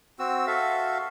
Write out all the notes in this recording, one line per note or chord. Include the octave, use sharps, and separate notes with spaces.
C4 F#4 E6
F#4 A4 E5 F5